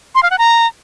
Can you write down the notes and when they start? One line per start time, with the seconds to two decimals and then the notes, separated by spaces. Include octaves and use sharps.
0.15 C6
0.23 F5
0.31 F#5
0.38 A#5